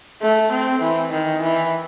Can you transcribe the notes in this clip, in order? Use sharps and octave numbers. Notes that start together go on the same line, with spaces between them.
A3
C4
E3
D#3
E3